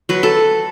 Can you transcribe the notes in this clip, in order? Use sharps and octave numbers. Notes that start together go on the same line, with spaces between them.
F#3 B4
A4